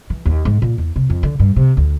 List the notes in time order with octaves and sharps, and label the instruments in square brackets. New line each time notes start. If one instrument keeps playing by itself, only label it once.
[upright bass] E3
D#2
G#2
A#2
E2
C3
F2
D3
G2
C3
D2